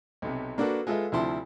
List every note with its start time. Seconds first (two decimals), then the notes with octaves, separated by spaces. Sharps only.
0.22 B1 C3
0.58 A#3 D4 F#4 A4 B4
0.87 G#3 F4 A4 B4 E5
1.12 D2 C3 F3 E4 A5 C6